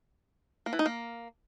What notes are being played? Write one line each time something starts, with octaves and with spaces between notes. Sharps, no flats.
A#3
E3
D#4
A#3